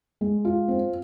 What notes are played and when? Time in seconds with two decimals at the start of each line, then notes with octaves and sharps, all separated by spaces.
0.21 G#3
0.45 F4
0.68 C4